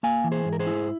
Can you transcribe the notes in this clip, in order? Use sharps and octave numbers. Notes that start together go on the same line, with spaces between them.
A#3 F5 G#5
E3
G#4 C5
G#2
A#4
G#4 C5
E4